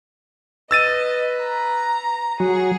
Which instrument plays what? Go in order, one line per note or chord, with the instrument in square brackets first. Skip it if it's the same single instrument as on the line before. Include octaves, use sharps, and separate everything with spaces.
[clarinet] B4 [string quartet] D#5 [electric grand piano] E6 A6 D#7
[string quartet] A#5
[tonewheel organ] F#3 [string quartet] G#4 [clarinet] F#5